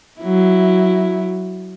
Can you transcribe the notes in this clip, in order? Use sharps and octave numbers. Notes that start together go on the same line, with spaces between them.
F#3 E4